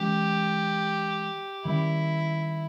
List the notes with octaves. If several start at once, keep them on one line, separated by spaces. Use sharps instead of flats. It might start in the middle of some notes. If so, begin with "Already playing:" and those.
Already playing: E3 G#3 C#4 G4
D#3 G3 C#4 E4